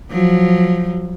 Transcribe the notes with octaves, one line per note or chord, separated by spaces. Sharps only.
F3 F#3